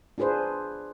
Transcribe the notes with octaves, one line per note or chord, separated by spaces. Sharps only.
D4 F4 G#4 B4 C5